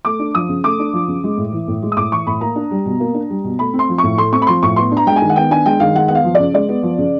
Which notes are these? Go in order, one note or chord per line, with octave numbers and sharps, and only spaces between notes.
A3 D6
D4
F3 D#6
C#3
A3 D6
D4
F3
C#3
G#3
A2
E3
A2
G#3
D#6
A2 D6
E3 C#6
A2 B5
A#3 A#5
D4
G3
B2
A#3
D4
G3
B2
A3 B5
C4
C6
F3
A2 C#6
A3 C6
C4 C#6
B5
F3 C6
A2 C#6
B3 C6
D4
A#5
G#3 G5
G#5
D#3
F#5
B3 G5
D4 G#5
G#3 G5
D#3 F5
G#3 F#5
B3 F#5
F5
F3
D5
C#3
G#3 D5
B3
F3
C#3